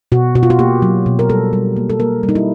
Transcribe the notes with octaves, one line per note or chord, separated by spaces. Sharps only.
B2 F#4
B2 F#4
F4
F#4
A#3 G4
F#3
B2
A#4
G3 A4
G3
A#3
A4
A#3 A#4
G3
D#4
E4